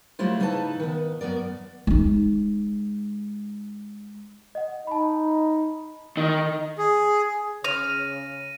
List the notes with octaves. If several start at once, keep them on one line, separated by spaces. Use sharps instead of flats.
F#3 G3 A3 E4 F4 C5
C#3 D#4 E4 B4 D5 A5
D#3 B3
F#2 B3 A#4 D5
G#3 D#4
D#5 F#5
D#4 A5 B5
D#3
G#4
C#3 C#5 F6 A#6 D#7